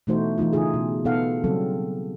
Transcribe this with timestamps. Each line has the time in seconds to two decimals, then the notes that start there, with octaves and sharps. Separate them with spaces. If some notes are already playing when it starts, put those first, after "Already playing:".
0.07 B2 E3 A3 D#4 F#4 C5
0.38 E3 A3 D#4 F4
0.53 C#3 E3 D#4 F4 G#4
0.74 B2
1.05 B2 B3 D#4 A4 F5 F#5
1.44 C#3 F#3 G3 C4 A4